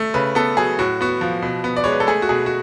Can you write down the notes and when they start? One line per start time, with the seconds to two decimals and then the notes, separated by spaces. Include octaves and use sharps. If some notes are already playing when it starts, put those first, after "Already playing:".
Already playing: A3
0.14 C#3 B4
0.35 B3 A4
0.57 F#3 G#4
0.79 A2 F#4
1.01 B3 F#4
1.21 F3
1.42 B2
1.64 B3
1.77 D5
1.84 G#3 C#5
1.92 B4
2.00 A4
2.07 A3 G#4
2.22 F#4
2.29 B2 G#4
2.46 F#4